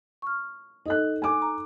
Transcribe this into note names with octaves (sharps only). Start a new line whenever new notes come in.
C#6 F6
D#4 A4 D#5 F#6
G#5 D6
A#5